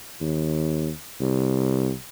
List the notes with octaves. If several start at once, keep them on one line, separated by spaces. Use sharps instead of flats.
D#2
C2